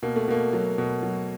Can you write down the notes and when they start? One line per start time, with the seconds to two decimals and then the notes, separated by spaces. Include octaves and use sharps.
0.02 B2 A#3
0.16 A3
0.28 B2 A#3
0.53 F#3
0.78 B2
1.03 F#3